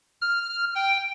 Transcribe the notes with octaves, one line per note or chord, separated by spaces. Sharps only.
F6
G5